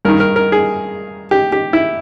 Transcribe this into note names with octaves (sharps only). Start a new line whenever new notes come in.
G2 D#3 A#4
A#4
A#4
G#4
G4
G4
E4